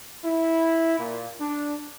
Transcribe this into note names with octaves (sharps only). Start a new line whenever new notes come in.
E4
A#2
D4